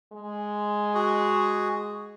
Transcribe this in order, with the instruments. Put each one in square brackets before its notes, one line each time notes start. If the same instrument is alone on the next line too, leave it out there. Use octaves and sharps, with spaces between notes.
[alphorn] G#3
[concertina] F#4 G#4